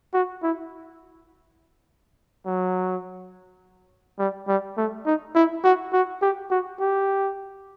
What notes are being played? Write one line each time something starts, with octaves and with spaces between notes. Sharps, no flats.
F#4
E4
F#3
G3
G3
A3
D#4
E4
F#4
F#4
G4
F#4
G4